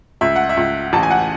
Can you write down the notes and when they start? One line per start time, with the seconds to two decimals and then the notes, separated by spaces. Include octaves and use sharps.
0.21 C#2 E5
0.36 F#5
0.49 E5
0.57 C#2
0.93 A1 A5
1.03 G#5
1.11 F#5